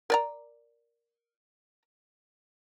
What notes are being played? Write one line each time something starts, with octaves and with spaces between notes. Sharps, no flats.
A#4 D5 A#5